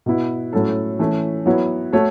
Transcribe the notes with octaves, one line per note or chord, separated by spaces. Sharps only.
B2 B3 E4
A2 F#3 C#4 A4
E3 A3 C#4
F#3 B3 E4 C#5
A3 F#4 A4 C#5